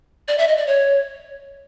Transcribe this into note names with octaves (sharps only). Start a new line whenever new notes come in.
D5
E5
D#5
D5
C#5